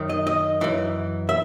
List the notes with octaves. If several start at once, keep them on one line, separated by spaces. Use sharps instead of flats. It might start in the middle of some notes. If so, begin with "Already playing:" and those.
Already playing: F#2 D#3
D#5
D#5
F#2 E3
E5